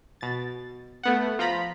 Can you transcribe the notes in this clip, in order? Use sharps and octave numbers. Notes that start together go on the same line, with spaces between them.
B2 A6
A3 B3 F#5
F3 F4 A#5 B5